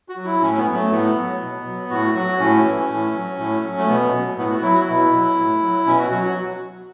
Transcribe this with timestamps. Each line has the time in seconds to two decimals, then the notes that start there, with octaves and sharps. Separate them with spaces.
0.09 F#4
0.16 F#3
0.25 E4
0.41 A2 C#4
0.58 B3
0.66 F#3
0.74 A3
0.91 A2 B3
1.16 F#3
1.41 B2
1.65 F#3
1.90 A2 F#4
2.14 F#3 F#4
2.39 A2 C#4
2.65 E3
2.89 A2
3.14 F#3
3.39 A2
3.63 F#3
3.78 A3
3.88 B2 B3
4.13 F#3
4.38 A2 B3
4.50 F#4
4.62 F#3 E4
4.75 F#4
4.88 B2 E4
5.13 F#3
5.37 A2
5.62 F#3
5.86 B2 C#4
5.99 F#4
6.11 F#3 F#4
6.24 F#4